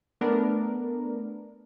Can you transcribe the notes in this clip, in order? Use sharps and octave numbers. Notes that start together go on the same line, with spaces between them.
A3 B3 D4 A#4